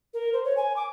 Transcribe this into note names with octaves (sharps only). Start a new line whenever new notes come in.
A#4
C5
C#5
G#5
D6